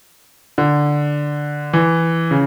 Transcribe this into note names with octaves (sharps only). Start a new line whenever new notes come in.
D3
E3
C#3